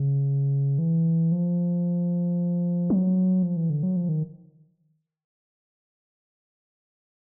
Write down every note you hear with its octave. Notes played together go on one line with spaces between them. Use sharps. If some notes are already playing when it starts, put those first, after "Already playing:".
Already playing: C#3
E3
F3
F#3
F3
E3
D3
F#3
F3
D#3